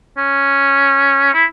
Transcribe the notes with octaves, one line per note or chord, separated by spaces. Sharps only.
C#4
E4